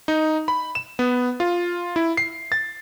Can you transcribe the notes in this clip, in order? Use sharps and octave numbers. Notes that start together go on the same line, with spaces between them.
D#4
B5
E7
B3
F4
E4
C7
A6